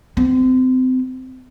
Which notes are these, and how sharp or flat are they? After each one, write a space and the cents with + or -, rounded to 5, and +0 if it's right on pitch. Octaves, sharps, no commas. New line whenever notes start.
C4 -30